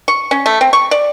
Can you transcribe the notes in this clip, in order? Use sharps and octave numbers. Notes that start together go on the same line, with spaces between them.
C#6
C#4
A3
C4
C#6
D5